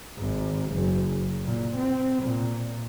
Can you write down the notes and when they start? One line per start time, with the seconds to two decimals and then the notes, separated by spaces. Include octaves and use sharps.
0.18 G#1
0.73 F#1
1.45 A#2
1.77 C4
2.23 A#2